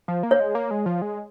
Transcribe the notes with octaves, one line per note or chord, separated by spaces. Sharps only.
F3
A#3
C#5
G#3
A#3
G#3
F3
G#3